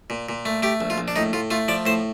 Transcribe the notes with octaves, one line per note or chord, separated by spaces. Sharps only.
A#2
A#2
A3
A3 G4
A#1
F4
A#1
D4
A2 D#4
A2 F4
A3 F4
F3 D5
A2 C5